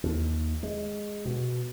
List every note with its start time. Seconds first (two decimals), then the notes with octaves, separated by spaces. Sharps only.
0.03 D#2
0.63 G#3
1.25 B2